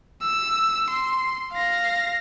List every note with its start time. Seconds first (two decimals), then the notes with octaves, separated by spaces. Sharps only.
0.22 E6
0.90 C6
1.53 F5 A#6